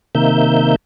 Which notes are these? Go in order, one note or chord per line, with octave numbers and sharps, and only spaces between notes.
C3 D#3 A#3 E5 G6